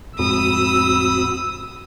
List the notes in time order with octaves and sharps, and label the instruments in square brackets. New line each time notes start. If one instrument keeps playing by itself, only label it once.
[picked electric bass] F2 A2 G#3 [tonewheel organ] C4 F#4 B5 [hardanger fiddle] D#6 [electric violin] E6